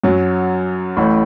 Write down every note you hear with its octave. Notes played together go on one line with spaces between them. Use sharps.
F#2 F#3
A1 A2